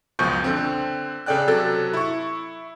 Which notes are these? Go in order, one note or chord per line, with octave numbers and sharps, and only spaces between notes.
C#2 F#2 B2 F3 C#6 G6
D3 C4
C#3 A4 D5 G5 F#6
C3 F#3 A4 A6
E4 C#6